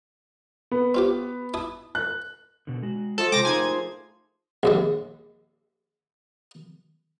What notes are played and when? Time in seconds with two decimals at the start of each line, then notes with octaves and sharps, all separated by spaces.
0.71 B3
0.95 C4 F4 G4
1.54 E4 A5 D#6
1.95 F#6
2.67 B2 D3
2.82 G#3 F#4
3.18 F3 A4 D#5
3.32 C3 G#3 G5 A5 C6 D6 A#6
3.45 A3 A#3 D#4 G#4 G#5 G#6
4.63 A#1 D#2 G#3